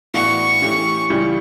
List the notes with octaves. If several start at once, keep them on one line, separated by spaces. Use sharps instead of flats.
A2 E3 B3 D4 F#4 C#6
E3 A3 C#4 G4
C#2 C#3 E3 G3